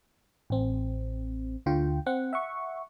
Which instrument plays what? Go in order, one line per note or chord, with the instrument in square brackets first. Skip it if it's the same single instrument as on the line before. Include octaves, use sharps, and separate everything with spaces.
[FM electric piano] A1 C4
D2 D3 F4 G5
C4 F#5
E5 F#5 C#6